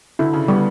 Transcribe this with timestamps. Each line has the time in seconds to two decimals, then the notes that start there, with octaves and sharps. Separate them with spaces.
0.19 D3 E4
0.33 C#3
0.48 G3 B3